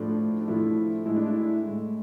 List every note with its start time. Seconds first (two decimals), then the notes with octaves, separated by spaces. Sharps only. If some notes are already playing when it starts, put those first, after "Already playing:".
Already playing: A2 F3 A3 D4
0.41 D4
0.48 A2 F3 A3 E4
1.06 A2 G#3 E4
1.16 D4
1.27 E4
1.64 A2 G#3